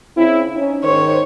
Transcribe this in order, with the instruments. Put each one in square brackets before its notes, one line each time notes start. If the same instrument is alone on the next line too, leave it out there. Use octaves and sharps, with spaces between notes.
[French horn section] C#3 C4 E4
C#4 D#4
[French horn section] G#2 D#3 C5 [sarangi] C#5